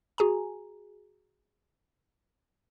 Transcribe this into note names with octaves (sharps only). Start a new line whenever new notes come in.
F#4 G#4 G#5 A#5